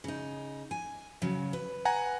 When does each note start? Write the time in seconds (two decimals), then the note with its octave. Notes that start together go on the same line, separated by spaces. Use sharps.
0.04 C#3 D#4
0.71 G#5
1.22 C#3 F#3
1.53 B4
1.85 F#5 G#5 A#5